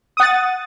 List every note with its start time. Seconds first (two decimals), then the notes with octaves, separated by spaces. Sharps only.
0.17 D#6
0.20 F#5
0.23 A6